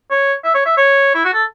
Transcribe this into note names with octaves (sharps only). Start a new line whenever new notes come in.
C#5
E5
C#5
E5
C#5
E4
F#4
A4